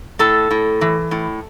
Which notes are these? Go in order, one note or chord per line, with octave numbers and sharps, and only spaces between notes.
A2 A4
A2
E3
A2